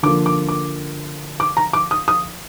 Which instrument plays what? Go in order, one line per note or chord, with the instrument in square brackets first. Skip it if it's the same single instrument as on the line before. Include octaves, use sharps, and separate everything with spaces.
[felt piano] D3 F3 A#3 D6
D6
D6
D6
A#5
D6
D#6
D#6